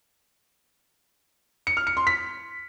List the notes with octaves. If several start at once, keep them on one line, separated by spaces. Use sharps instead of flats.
C#7
F6
C#7
C6
B6